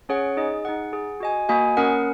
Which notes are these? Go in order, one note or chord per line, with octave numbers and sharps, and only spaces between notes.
C#4 G#4 C#5 F#5
D#4 G#4 D#5
D#4 G#4 F#5
G#4 F#5
F#4 D#5 G#5
A#3 F#4 D#5 G#5
A#3 C#4 A#4 F#5